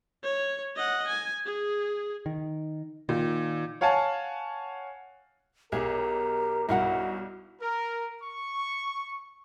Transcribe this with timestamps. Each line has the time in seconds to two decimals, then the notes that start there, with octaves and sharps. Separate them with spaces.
0.24 C#5
0.76 D#5 F#5
1.08 G#5
1.46 G#4
2.26 D#3
3.09 A#2 D#3
3.81 C#5 F5 F#5 G#5 A5
5.72 B1 G4 G#4 A#4
6.69 B1 G2 D#4 E4 F#4 A#4 F#5
7.60 A#4
8.22 C#6